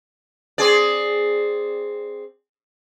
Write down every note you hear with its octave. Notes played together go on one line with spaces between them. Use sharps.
C4 G#4 D5